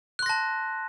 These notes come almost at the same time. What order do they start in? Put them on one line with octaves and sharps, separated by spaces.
F#6 C6 A#6 A5